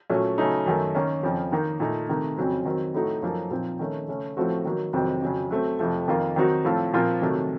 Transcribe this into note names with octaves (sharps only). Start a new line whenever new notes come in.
A#2 F#3 A3 C#4
C#3 F#3 A3 D#4
F#2 D#3 A3
D#3 A#3 C#4
F2 C#3 F3
D#3 A#3 D#4
A#2 A3 D#4
C3 D#3 A3 D#4
F2 C#3 F#3 C4
D#3 F#3 C4
A2 A3 D#4 F#4 A4
F#2 F3 A#3 D#4 A4
A#2 F3 C4 D#4
D#3 A3 C#4
C#3 A3 C#4
A2 F3 A3 C4 F#4
D#3 F#3 A#3
F2 C3 D#3 F#3 C4
F2 C#3 F#3
F#3 A3 C4
F2 C3 F3 A3
F2 D#3 A#3 F4
D#3 F#3 C4 D#4 F#4
A2 F3 C4 F4 A4
A#2 F3 C4 F4 A#4
C3 D#3 F#3 A3